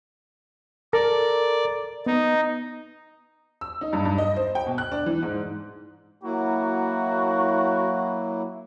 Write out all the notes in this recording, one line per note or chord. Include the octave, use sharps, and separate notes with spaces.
A4 A#4 D5 A#5
B3 D#4
E6
D#4
G2
G2
D#5
C5
G5
B2
F#6
D4
E3
G#2
F#3 A#3 E4 F#4